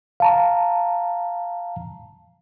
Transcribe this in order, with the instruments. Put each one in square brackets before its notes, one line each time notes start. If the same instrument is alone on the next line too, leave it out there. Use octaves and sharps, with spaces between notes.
[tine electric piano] F5 A5 A#5